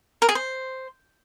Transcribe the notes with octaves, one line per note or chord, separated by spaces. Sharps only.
A#4
G#4
C5